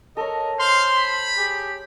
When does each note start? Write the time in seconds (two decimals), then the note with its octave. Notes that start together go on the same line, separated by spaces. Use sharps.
0.17 A4 A#4 C#5 D#5
0.59 C5 F5 C6
0.97 B5
1.38 G4 G#4